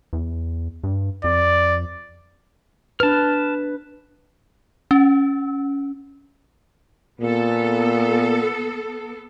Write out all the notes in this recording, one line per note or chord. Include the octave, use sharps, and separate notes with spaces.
E2
G2
F2 D5
D4 B4 A5 F6
C#4
A#2 B3 A4